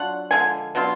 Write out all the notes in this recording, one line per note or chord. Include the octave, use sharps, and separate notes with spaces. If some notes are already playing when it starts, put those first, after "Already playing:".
Already playing: F#3 D4 F4 F#5
D3 F3 G#3 G#5
B2 F#3 D4 F4